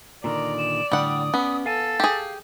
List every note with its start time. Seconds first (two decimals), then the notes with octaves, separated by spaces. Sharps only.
0.24 A#2 D3 D#3 D5 A#5
0.58 E7
0.92 A2 D3 G3 F#5 D#6
1.34 B3 C#4
1.66 A4 F5 G#5 A6
2.00 G4 G#4